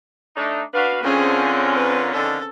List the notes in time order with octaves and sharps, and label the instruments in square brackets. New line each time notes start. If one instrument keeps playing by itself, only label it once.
[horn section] A3 D4 D#4
[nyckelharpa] D4 [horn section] F#4 B4 F5
[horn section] D3 F4 A#4 [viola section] C4 C#4 [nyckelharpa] G#4
[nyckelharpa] B4
[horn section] D3 D#3 F3 [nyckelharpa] A4